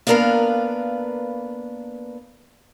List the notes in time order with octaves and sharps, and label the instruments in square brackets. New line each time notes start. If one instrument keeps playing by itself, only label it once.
[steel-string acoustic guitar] A#3 B3 D4 A#4 B4 F5